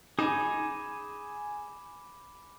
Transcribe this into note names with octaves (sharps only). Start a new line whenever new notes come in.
D#4 G#4 G#5 B5 D6 E7